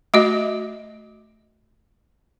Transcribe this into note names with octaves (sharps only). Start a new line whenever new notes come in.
A3 F#4 D#5